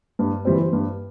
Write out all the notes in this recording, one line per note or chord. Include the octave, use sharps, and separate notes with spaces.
G2
E3 G3 C4
G2